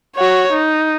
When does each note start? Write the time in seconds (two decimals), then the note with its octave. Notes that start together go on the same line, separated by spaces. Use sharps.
0.17 F#4 C#5
0.52 D#4